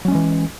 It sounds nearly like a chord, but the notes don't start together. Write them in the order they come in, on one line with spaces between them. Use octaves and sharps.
F#3 C#4 G#3 E3